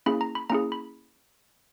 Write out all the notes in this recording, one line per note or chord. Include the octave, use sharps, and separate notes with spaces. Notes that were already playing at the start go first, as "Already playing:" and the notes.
A#3 C#4 E4 G#4 B5
A#5
B5
A#3 C#4 E4 G#4 A#5
B5